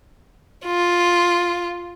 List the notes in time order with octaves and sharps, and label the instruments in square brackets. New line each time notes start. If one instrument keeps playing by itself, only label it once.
[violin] F4